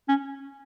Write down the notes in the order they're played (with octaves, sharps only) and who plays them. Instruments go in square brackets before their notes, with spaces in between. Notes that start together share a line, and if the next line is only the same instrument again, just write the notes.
[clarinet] C#4